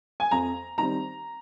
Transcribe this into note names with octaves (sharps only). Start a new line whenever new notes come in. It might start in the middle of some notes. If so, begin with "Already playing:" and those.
G#5
F2 A#5
D#3 G3 C4 A#5